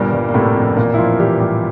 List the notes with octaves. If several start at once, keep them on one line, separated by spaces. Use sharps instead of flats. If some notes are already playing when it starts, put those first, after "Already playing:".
Already playing: G1 G2 A#2 A#3
G1
A#3
A2 C3 A3
F2
A1 A#2 A#3
E4
A1 F3 F4
E3 G3 G4
A2 G3 G4